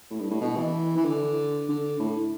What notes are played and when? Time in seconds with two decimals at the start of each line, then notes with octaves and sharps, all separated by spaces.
0.10 A2
0.20 G2
0.31 A2
0.41 B2
0.57 E3
0.97 E3
1.05 D3
1.68 D3
2.00 A2